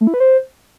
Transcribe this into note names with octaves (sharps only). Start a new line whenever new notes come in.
A3
E4
B4
C5